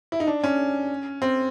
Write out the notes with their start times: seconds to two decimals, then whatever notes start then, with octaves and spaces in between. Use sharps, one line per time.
0.12 E4
0.20 D#4
0.27 D4
0.44 C#4
1.22 C4